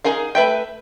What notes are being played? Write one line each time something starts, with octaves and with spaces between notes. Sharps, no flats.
D#4 G#4 A#4 F5
A3 B4 E5 G5